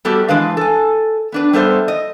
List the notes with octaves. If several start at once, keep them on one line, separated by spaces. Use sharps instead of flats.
G3 A3 B3 F#4 G4 A4
E3 G#3 D4 B4 F5
A4 G#5
B3 D4 B4
G3 B3 A4 C5 E5
D#5